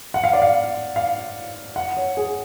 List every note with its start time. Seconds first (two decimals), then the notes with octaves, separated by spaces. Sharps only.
0.14 F#5
0.24 F5
0.33 D5
0.42 F5
0.96 F5
1.76 F#5
1.97 C#5
2.17 G#4